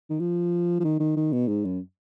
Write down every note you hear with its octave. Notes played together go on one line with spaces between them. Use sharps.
D#3
F3
F3
D#3
D#3
D#3
B2
G#2
F#2